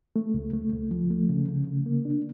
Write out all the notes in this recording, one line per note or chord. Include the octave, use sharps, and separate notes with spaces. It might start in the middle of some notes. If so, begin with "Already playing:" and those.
A3
C#2
A3
C#2
F3
A3
C#3
C#3
C#3
A#3
D4